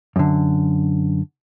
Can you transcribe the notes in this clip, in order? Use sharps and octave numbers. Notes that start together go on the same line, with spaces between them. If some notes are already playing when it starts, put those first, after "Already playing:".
F#2 D3